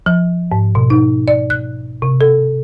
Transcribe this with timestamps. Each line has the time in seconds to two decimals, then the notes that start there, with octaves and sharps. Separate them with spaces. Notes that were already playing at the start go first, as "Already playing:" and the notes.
0.06 F3
0.52 G#2
0.75 B2
0.90 D#4
1.28 D5
1.50 F#6
2.02 C3
2.21 A4